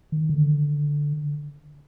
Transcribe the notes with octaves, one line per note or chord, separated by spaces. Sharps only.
D#3
D3